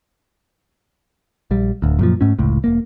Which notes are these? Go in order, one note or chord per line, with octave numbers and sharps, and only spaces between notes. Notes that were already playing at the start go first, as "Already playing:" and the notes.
A#1 G3
D1 D2
F#2 A#2 F3
G#2 A3 C#4
F1 C#2 A2
E1 A#3